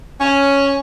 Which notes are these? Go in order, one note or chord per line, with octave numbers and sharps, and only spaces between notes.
C#4